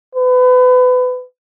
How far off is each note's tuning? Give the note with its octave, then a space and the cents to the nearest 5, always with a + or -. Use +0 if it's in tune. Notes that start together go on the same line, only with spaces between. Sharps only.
B4 +30